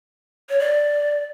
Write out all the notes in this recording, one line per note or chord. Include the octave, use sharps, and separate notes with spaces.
C#5
D5